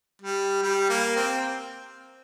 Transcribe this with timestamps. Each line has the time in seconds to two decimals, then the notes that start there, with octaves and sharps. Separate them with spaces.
0.22 G3
0.63 G3
0.90 A#3
1.17 C4